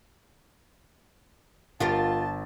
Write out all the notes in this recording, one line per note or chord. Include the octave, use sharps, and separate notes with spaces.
G1 F4 G4 A#4 A5 A6